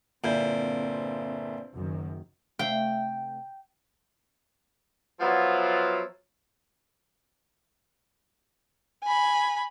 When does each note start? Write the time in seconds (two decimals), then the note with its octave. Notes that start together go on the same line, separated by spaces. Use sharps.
0.24 G1 A#2 C4 E4 G6
1.73 F#1 F#2 D#3
2.59 C3 A3 F5 G5
5.21 F3 F#3 B3 E4 F4
9.03 G#5 B5